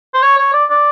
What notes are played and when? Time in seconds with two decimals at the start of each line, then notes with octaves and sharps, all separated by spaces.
0.14 C5
0.22 C#5
0.38 C#5
0.53 D5
0.70 D5